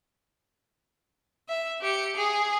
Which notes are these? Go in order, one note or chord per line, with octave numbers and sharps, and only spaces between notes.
E5
G4 C#7
G#4